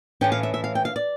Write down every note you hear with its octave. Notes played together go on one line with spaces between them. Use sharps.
A2 E3 A3 C#4 G5
F5
E5
E5
F5
G5
F5
D5